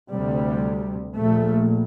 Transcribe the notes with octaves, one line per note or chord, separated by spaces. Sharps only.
D2 C3 G3
A#1 A#2 A3